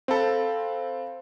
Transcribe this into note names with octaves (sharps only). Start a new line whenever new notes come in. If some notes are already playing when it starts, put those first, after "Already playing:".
C4 A4 C5 F5 B5